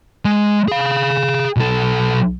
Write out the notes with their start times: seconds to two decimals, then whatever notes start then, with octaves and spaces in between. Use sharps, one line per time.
0.25 G#3
0.68 G#4 F5
1.56 B1 A4